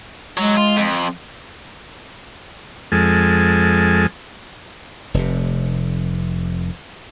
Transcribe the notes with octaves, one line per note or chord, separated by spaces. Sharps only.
F#3 G#3
F4
F2
F2 G#3 A4
F1 C3